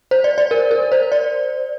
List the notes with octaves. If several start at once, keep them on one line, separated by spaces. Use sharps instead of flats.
C5
D5
D5
A#4
A#4
C5
D5